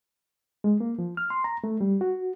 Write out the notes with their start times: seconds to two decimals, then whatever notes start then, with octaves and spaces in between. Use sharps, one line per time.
0.64 G#3
0.80 A#3
0.99 F3
1.17 F6
1.30 C6
1.44 A#5
1.64 A3
1.81 G3
2.01 F#4